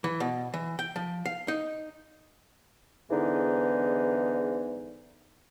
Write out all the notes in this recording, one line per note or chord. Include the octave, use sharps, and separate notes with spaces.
E3
B2
E3
G5
F3
F5
D#4
E2 G#2 D3 E3 B3 D#4